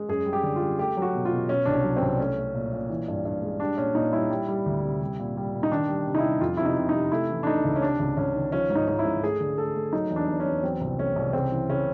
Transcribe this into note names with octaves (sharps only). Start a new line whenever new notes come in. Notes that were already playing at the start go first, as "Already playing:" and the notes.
Already playing: G#3
F#2 G#4
G3
G4
D3
F4
G3
A3 G4
F#3 F#4
B2
F4
B2
B2 C#4
C2 D4
C#4
F#3
C4
C2
A3 C#4
A3
A#2
A#2
E3
G2
G2
G#3
G3 D4
A#2 C#4
A#2 D#4
G3 E4
G3
G3
D2
C3
G3
A#2
G3
A#2
D#4
D#3 D4
G3
C3
D#4
E4
G3
F2 F4
C3 E4
D#4
C3
D#4
C3
A3 E4
E3
D4
A3 D#4
C#2
C#4
C3 D4
C#2
C#2 C#4
D#3
F3 C#4
G#2
D#4
G#2 D#4
E4
G#2
A3 G#4
D3
A3 A4
A3
F#3 D#4
E2
D4
E2
C#4
E2
F#3 C4
C2
A3 C#4
C2
C#3 C4
E3
C#3 C#4